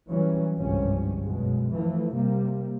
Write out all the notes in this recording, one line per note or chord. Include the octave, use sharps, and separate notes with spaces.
E3 F#3 G3 C#4
G1 C2 G#2 F3 G3 C#4
F#2 B2 G#3
E3 F3 A3
C3 G3 A#3